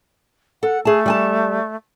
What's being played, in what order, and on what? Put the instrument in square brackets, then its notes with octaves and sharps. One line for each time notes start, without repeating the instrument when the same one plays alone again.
[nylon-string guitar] A4 [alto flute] F#5
[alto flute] A3 [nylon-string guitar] G#4 A5
[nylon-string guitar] G3 G#5 A5